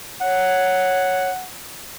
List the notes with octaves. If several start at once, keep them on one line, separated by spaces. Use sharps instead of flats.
C#5 F#5